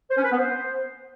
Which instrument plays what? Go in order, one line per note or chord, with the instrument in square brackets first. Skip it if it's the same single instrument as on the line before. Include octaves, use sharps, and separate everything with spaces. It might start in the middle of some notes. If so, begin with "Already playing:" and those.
[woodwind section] C5
C#4
B4
B3
C5